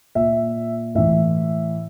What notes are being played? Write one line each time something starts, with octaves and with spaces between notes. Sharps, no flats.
A#2 E5
A2 E3 E5